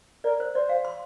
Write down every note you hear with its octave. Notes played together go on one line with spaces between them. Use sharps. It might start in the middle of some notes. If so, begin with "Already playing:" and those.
A#4 D5
C5
C5 D5
F5
C6